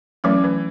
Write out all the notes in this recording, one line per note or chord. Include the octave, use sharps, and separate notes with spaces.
E3 F#3 A3 C#4
E3